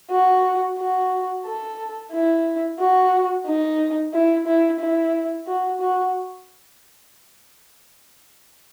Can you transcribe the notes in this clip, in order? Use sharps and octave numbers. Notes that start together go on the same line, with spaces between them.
F#4
F#4
A4
E4
F#4
D#4
E4
E4
E4
F#4
F#4